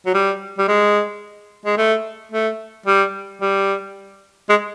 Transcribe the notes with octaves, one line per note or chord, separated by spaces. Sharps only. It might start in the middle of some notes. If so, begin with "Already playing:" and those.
F#3
G3
G3
G#3
G#3
A3
A3
G3
G3
G#3